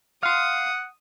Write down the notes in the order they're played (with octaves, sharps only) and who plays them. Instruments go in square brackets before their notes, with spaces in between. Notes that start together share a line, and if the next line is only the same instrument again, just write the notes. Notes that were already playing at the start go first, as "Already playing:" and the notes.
[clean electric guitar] F5 C6 [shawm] F#5 [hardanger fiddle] D#6